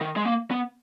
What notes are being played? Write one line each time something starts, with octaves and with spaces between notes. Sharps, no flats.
D#3
G#3
A#3
B3